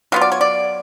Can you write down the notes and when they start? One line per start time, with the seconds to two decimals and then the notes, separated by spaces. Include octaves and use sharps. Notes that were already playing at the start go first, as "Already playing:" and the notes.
0.12 F#3 B3 F4 F5
0.21 D5
0.32 C#5
0.41 D5